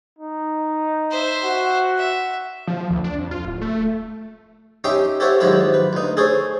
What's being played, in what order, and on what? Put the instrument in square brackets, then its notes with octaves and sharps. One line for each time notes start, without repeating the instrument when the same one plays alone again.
[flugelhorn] D#4
[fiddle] C5 E5
[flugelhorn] F#4
[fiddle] E5
[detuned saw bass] F3
D2
D4
F2
F4
D1
A3
[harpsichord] C#4 D#4 G4 E5 G5 C6
G4 A4 C5 C#5 E5 F#5
G#2 D#3 F3 F#3 E4 G4
B4
D2 D#4
G#4 A4 C5 C#5